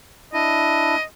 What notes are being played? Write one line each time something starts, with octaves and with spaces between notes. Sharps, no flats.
D4 E4 D#5